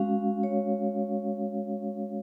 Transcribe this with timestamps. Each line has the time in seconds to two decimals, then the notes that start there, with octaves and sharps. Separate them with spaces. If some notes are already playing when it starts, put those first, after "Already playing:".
Already playing: G#3 C#4 F#4 F5
0.43 C#5